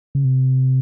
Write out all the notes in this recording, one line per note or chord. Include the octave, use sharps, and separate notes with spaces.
C#3
C3